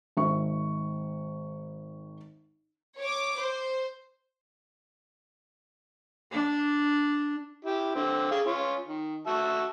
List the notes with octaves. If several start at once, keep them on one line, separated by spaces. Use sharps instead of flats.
G#1 E5 C#6
C#5 D6
C5
D4
E4 G4
D3 C4
G#4 F5
C#4 F4
D#3
F#4 E5 A5